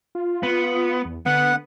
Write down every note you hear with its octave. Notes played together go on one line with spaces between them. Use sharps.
F4
B3
E2
D3 B3 F#5